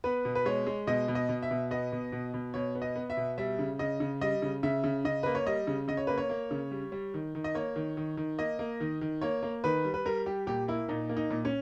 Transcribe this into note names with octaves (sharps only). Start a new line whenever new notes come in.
B3 B4
B2
B4
G#3 C#5
G#3
B2 D#5
B2
D#5
B2
E5
B2
B3 D#5
B2
B2
B2
B2 C#5
B3
D#5
B3
E5
B2
G3 E5
C#3
C#3 D#5
C#3
G3 D#5
C#3
C#3 E5
C#3
C#3 D#5
A#3 B4
C#5
G3 D#5
C#3
C#3 D#5
C#5
A#3 B4
C#5
A#3
C#3
G3
G3
D#3
D#3
D#5
A#3 C#5
D#3
D#3
D#3
A#3 D#5
A#3
D#3
D#3
A#3 C#5
A#3
D#3 B4
G3
B4
G3 A#4
G3 G4
A#2 G4
A#3 E4
A#2 D#4
A#3
D#4
A#2
C#4